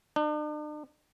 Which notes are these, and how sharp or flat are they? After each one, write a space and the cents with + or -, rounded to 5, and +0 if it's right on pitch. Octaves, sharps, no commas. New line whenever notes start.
D4 +45